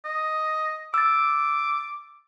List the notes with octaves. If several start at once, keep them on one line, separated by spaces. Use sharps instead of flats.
D#5
D6 E6 A6